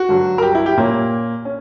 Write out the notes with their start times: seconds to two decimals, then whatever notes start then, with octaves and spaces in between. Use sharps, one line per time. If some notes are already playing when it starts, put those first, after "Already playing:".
Already playing: F#4
0.09 G2 D3 F#3
0.38 A#4
0.42 G4
0.55 E4
0.66 G4
0.77 A#2 A#3 C#4
1.45 C#4